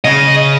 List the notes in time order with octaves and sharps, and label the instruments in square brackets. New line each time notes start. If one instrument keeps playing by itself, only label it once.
[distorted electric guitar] C#3 [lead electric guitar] D#5